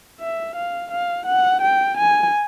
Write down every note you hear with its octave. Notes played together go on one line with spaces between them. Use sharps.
E5
F5
F5
F#5
G5
G#5